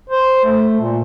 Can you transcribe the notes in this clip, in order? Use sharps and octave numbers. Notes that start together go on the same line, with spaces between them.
C5
A3
A#2